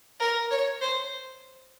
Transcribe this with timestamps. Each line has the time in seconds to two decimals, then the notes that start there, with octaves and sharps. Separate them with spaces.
0.20 A#4
0.51 C#5
0.81 C5